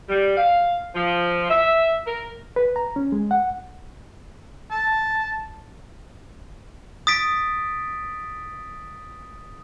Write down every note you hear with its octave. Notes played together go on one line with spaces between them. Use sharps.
G3
F5
F3
E5
A#4
B4
A#5
C#4
G#3
F#5
A5
D#6 A6 B6 D7